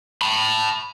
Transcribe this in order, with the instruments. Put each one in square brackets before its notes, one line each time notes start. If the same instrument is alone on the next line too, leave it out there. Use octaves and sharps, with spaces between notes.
[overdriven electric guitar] A5 B5